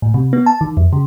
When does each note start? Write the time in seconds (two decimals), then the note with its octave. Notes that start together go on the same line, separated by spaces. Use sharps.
0.02 A2
0.14 C3
0.33 B3
0.46 A5
0.61 D#3
0.77 F2
0.93 C#3